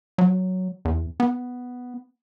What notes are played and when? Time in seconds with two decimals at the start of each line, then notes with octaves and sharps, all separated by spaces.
0.18 F#3
0.85 E2
1.20 B3